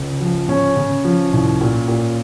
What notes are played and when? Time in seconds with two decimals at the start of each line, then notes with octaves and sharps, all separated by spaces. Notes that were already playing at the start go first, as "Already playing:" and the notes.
Already playing: C#2
0.21 F3
0.48 C#3 C#4
0.76 C#3
1.05 F3
1.33 C2
1.61 A#2
1.88 A#2